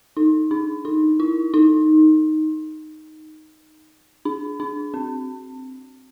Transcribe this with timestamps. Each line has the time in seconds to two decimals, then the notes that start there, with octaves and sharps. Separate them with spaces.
0.17 D#4
0.51 D4
0.85 D#4
1.20 E4
1.54 D#4
4.25 D4
4.60 D4
4.94 C4